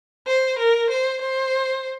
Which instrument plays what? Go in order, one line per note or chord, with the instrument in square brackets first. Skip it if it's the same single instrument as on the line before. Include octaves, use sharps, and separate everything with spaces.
[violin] C5
A#4
C5
C5